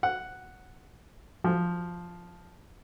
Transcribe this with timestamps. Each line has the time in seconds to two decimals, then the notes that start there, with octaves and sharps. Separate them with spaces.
0.03 F#5
1.44 F3